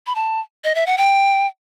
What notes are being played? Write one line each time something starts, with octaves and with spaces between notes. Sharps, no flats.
B5
A5
D#5
E5
F#5
G5